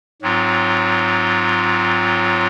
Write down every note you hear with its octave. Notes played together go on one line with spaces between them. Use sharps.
G#2 F#3 C4 F4